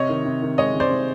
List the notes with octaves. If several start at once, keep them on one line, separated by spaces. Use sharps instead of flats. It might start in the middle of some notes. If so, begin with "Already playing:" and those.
Already playing: C3 C#5 D#5
D#3
C3
D#3
G#3 C#5 D#5
C3
C5 D5
C3